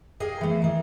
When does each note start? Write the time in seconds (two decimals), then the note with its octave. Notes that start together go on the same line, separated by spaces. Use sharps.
0.20 G4 G#4 D#5 F5 G5
0.41 E3 A3
0.62 D#3 E3